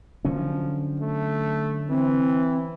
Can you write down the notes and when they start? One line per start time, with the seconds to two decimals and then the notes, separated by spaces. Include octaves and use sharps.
0.25 D3 F3 F#3 C#4
0.99 A3
1.89 E3 C4